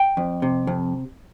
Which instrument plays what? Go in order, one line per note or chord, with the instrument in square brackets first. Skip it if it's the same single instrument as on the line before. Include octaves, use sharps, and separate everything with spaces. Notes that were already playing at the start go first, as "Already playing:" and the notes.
Already playing: [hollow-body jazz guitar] G5
F2
C3
F2